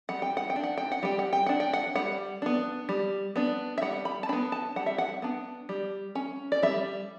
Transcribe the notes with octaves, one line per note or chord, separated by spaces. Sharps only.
G3 F#5
G5
F#5
G5
D4
F#5
G5
F#5
G3 G5
F#5
G5
D4 F#5
G5
F#5
G3 F#5
B3 D4
G3
B3 D4
E5
G3 F#5
B5
A5
B3 D4 B5
A5
G3 F#5
E5
F#5
B3 D4
G3
C#4
D5
G3 E5